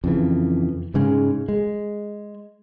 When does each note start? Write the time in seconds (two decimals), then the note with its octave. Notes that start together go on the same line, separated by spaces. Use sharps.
0.04 F2 C#3 E3
0.94 G#2 C#3 G#3
1.48 G#3